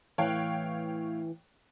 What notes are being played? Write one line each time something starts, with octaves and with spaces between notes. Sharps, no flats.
A2 E3 C#5 F5 G5 F#6